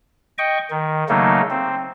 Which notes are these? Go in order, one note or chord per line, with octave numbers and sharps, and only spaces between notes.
D#5 G5 C#6
D#3
C#3 F#3 A3 A#3 D#4
C4